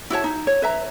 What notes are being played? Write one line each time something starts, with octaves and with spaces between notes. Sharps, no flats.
E4 F#4 C#5 A5
D#4
C#5
B4 E5 A#5